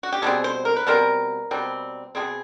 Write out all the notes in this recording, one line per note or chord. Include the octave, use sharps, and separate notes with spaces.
F#4
G4
B2 G3 C4 G#4
C5
A#4
B4
B2 G3 C4 A#4
B2 G3 C4
B2 G3 C4 G#4